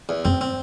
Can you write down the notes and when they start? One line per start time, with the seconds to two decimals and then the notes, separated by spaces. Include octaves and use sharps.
0.09 E2
0.25 F#2 C4
0.41 C4